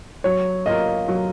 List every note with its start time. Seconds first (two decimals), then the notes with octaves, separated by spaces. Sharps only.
0.24 F#3 C#5
0.66 A#3 F4 A#4 D#5
1.08 F#3